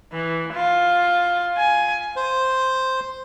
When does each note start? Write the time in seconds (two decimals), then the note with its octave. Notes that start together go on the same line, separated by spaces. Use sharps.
0.13 E3
0.53 F4
1.57 G#5
2.16 C5